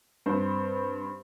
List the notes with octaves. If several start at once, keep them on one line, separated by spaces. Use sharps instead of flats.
G2 C4 C5